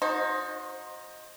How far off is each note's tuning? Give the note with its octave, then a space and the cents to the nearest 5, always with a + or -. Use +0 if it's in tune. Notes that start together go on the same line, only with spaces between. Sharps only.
D#4 +0 F#4 -35 C5 +20